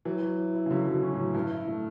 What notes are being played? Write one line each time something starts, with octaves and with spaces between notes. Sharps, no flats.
E3 F#3
F#3
E4
E4
C#3
D3 F#3
B2 F#3
C#4
A2
F#3
G2 E4
E4
A3